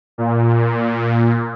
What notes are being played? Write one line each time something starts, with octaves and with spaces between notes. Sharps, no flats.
A#2